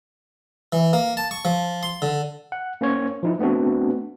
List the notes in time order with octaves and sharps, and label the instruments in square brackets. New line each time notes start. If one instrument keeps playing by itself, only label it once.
[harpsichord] E3
A#3
A5
C#6
F3
C6
D3
[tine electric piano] F#5
A#3 C#4 C5 C#5
F3 D#4 E4
A3 B3 C4 D4 F#4